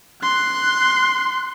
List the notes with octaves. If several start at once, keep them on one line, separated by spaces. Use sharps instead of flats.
C6 F#6